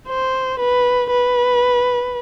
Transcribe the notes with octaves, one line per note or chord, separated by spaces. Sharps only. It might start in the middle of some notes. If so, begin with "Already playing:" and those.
C5
B4
B4